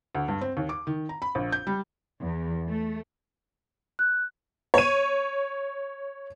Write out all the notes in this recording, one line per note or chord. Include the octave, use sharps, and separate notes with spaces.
D2
G2
C4
D#2
D6
D#3
A#5
B5
A#1
G6
G3
E2
A3
F#6
C#5 D#7